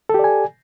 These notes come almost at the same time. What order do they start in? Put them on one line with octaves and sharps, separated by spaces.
A4 G4 D5 G#5